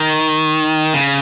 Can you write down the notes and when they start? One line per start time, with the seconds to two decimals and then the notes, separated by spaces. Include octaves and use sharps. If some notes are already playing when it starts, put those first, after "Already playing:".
Already playing: D#3
0.94 C#3